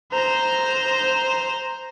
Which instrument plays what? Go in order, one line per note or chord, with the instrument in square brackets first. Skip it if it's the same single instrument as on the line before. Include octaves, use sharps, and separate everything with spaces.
[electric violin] C5 A#5